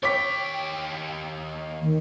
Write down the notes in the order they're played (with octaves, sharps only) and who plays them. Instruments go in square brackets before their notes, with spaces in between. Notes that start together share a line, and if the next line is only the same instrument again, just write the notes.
[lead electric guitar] D#2 G5 [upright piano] C#5 D6 B6
[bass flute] D#3